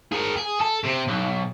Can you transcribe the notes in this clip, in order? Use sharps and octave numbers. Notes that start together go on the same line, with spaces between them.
G#4 A#4
G#4
A4
C3
B1